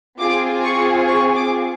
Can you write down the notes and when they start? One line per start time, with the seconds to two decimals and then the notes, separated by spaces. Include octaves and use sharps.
0.20 C4 F4 G#4 D6
0.63 C#6
1.07 C#6
1.35 D6